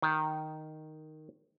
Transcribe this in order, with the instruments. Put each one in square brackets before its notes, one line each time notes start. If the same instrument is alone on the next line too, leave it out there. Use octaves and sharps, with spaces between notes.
[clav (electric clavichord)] D#3